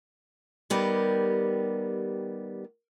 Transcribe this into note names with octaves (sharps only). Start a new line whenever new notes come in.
D#3 G3 B3 G4 A#4